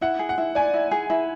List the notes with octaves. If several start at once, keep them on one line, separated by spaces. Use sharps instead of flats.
E4 F#5
G#4
F#5
E4
D5 G#5
E4
G#4
E4